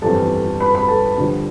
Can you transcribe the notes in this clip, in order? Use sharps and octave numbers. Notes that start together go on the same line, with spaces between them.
G1 F2 E3 G3 A4 A5
B4 B5
B4 B5
A4 A5
G2 D3 F3